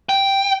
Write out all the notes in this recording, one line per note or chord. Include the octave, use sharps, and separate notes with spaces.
G5